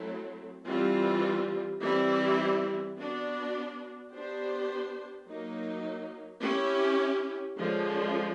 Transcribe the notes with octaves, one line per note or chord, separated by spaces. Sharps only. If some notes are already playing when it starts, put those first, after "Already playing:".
Already playing: F#3 A3 C4 E4 A4
E3 G3 C4 F4
E3 G3 C4 E4
B3 D4 F#4
B3 D4 G4 C5
F#3 A#3 D#4
C#4 E4 G4
D3 F3 G#3 C#4